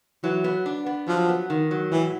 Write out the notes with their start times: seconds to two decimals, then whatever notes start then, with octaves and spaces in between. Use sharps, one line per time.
0.24 E3 F#3
0.44 B3
0.66 D4
0.86 B3
1.08 F3 F#3
1.29 B3
1.50 D#3
1.71 F#3
1.92 A2 E3